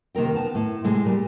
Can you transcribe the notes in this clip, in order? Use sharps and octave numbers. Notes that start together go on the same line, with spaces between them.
C3 D#3 A#3 A#4 G5
B3 A5
A2
A2 C3 G#3 E4
A#2 G3